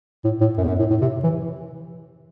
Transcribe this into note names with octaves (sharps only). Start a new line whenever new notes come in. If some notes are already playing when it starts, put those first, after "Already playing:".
A2
A2
F#2
E2
F#2
A2
A2
C3
E3